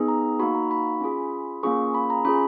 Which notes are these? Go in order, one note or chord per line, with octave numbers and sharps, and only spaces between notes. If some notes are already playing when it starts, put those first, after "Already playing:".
Already playing: B3 D#4 G#4
A#5
A#3 D#4 F#4 B5
A#5
B5
C#4 F4 G#4
A#3 C#4 F4 G#4 C#6
B5
A#5
C#4 F4 G#4 B5